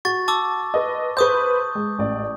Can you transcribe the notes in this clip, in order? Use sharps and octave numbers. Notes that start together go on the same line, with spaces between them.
F#4 C#6 A6
A5 D6 E6
B4 D#5
B4 C5 C#6 D#6 G6
G#3
A1 D5